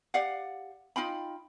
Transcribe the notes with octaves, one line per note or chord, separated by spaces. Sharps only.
G4 D5 F5 F#5
D#4 F4 G5 B5